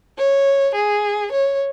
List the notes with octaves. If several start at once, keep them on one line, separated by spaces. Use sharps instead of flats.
C#5
G#4
C#5